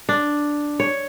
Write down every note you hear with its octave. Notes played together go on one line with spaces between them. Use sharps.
D4
C#5